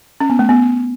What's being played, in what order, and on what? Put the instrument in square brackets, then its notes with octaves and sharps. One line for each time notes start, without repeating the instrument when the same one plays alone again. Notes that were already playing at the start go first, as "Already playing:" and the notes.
[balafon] C#4
B3
A3
B3